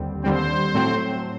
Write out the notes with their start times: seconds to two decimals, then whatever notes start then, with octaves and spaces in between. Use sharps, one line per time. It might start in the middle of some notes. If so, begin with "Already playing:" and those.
Already playing: D#2 D3 G3 C4
0.24 D#2 D3 G3 C4 C5
0.74 A2 F#3 A3 C4